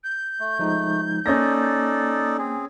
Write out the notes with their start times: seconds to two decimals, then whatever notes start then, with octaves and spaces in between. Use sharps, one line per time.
0.03 G6
0.40 A3
0.59 F3 G#3 D#4
1.26 A#3 C#4 D#4 A4 D5 A#6
2.38 C4 G#4